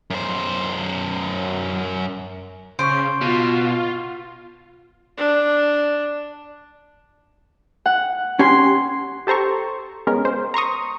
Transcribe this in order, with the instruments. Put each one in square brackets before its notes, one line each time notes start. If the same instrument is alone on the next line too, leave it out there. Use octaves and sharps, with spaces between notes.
[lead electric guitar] F#2 C5
[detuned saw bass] C#3 [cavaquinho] C5 [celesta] C#6 D7
[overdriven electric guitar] B2 [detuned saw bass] F4
[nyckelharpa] D4
[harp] F#5
[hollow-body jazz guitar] C#4 G4 G#5 [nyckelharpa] C6
[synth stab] G4 A4 C5 A#5 C#6
G#3 B3 C#4 A#4
C5
A#5 C6 C#6 D#6